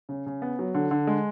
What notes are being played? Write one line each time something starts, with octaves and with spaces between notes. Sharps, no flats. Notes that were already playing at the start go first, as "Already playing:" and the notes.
C#3
C#3
B3
F#3
D3
D3
G#3